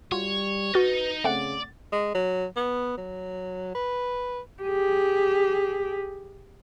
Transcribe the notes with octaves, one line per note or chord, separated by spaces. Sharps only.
G3 F4 F#4 C#5
D#4 F#4 B4 F6 A6
C#3 A3 C4 D5 F#5
G#3
F#3
B3
F#3
B4
G4 G#4